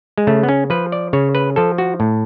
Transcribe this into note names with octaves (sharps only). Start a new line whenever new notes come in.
G#3
C#3 A3
B3
C#4
F3 B4
D5
C#3 C#5
B4
F3 A4
F#4
A2